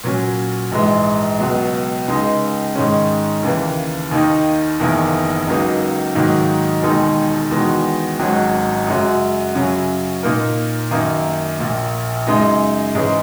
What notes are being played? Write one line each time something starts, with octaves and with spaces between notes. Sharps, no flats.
A#2 F#3 C#4
A#1 G#2 E3 G#3
C#2 B2 F#3
C#2 C#3 G#3 D#4
G#2 D#3 G#3 C#4
D#2 C#3 E3 A#3
D#2 D#3 A#3 D#4
F#1 E2 D#3 A#3 E4
C#2 C#3 F#3 A#3 D#4
G#2 D#3 F#3 A#3
E1 D#2 D#3 G#3 D#4
E2 D#3 G#3 D#4 F#4
G#1 G#2 F#3 C#4 F#4
F#2 C#3 G#3 C#4 F#4
F#2 C#3 F#3 C#4
A#2 A#3 D#4 A#4
F#2 D#3 A#3 D#4
A#1 A#2 A#3
F#2 C#3 G#3 D#4
G#2 E3 G#3 C#4 G#4